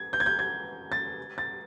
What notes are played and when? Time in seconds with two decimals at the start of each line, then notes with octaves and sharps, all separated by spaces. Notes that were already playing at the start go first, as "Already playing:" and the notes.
Already playing: G#6
0.13 G6
0.20 G#6
0.26 G6
0.39 G#6
0.92 A6
1.38 A6